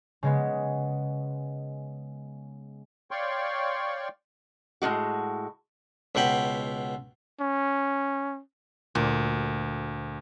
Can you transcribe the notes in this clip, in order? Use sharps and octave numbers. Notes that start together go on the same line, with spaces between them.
C#3 G#3 B3
C#5 D5 F5 G5 C6 C#6
A2 C#3 G#3 F#4
C#2 B2 F#5 G5 B5
C#4
D2 A#2